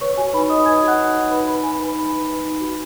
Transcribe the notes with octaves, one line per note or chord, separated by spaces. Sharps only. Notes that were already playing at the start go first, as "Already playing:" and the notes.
B4 C#5 C#6
F#4 G#5
D#4 B4 B5
D#4 D#5 D#6
B4 G#5 G#6
F#4
F#5 F#6
D#4
D#4
D#4 B4 B5
B4 B5
B4 G#5
D#4 B4 B5
D#4
B4
B4
D#4
F#4